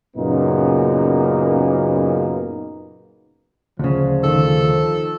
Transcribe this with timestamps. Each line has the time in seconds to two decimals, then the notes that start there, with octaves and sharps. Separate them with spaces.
0.17 F#2 A#2 C#3 A#3 B3 D#4
3.79 D2 C#3 F3
4.24 D#3 A4